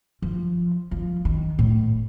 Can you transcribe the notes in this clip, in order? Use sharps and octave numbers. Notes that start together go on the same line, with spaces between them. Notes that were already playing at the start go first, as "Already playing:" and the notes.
F3
F3
D#3
A2